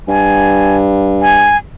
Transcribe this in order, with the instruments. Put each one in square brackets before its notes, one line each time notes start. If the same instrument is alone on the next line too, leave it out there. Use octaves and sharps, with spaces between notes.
[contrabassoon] G2 [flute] G#5
[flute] G#5